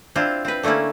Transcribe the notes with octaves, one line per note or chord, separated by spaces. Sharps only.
C4 D4 E4 F4
C4 B4
D3 A3 A#3 C#4 E4